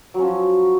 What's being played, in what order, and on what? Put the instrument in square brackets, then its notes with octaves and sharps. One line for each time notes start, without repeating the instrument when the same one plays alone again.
[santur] F#3
C#4
F3